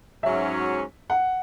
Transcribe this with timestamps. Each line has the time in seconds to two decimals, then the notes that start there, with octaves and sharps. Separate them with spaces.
0.22 G#2 F#3 C#4 E5
1.10 F#5